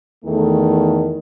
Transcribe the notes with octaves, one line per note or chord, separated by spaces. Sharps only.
E2 D#3 A3